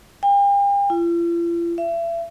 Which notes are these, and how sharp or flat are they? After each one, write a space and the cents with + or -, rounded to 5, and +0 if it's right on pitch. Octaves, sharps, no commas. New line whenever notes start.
G5 +40
F4 -45
E5 +35